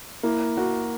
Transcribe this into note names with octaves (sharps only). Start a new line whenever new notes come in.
A#3 E4
A#3 F#4